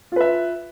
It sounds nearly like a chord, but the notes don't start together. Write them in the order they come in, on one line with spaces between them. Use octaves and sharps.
F4 B4 E5